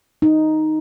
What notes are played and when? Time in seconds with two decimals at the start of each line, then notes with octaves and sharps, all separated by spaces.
0.22 D#4